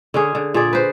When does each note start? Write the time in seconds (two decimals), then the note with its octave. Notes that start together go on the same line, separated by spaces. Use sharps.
0.14 D3 C#4 G#4
0.35 D3
0.54 A#2 G#4 D5
0.73 B4 C5